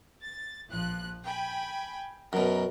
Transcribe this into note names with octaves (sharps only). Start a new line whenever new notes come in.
A6
A#1 F3 F#6
G5 G#5 B5
F#2 B2 A#4